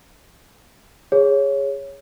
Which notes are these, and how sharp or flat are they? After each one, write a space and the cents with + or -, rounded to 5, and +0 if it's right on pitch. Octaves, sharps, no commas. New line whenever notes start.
G#4 -15 C#5 +0